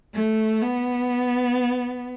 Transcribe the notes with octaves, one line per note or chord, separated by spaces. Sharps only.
A3
B3